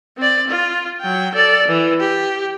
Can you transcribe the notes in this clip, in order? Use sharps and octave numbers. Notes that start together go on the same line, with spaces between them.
C4 D5
F4
F#3 G5
A4 D5
E3
G4